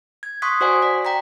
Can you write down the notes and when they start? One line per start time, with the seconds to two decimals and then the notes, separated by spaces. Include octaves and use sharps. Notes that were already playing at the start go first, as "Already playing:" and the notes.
0.23 G#6
0.42 C6 C#6 D#6 F#6 B6
0.61 F#4 C5 D5 F#5 G#5
0.82 D5 B6
1.05 D5 G5 A#5 B6